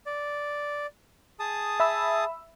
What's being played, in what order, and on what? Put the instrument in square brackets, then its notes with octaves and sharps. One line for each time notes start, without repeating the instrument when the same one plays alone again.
[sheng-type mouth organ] D5
G#4 A5 D#6
[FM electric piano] E5 B5 E6